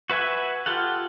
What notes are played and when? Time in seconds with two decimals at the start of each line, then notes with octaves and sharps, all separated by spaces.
0.10 F#4 B4 E5 G#5
0.66 F4 G4 A4 F#5